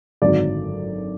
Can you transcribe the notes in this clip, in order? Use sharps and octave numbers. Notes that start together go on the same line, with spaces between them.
G#1 F#2 D3 F#3 D5